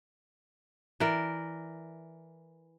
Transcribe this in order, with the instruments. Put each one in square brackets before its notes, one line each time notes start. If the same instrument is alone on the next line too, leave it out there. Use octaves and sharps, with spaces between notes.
[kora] E3 A#4 D5